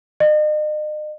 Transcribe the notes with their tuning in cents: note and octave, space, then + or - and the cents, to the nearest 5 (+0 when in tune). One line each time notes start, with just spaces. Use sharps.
D#5 -40